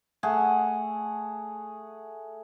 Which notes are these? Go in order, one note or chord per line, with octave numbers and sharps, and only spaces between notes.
A3 G#4 F#5